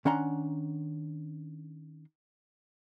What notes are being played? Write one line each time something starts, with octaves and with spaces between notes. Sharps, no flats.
D#3 C#4 D4 F#5 A#5 C6